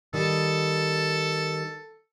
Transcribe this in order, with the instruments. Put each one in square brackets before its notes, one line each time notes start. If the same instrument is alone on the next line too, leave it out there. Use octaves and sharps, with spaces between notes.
[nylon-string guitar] D#3 G3 [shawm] A4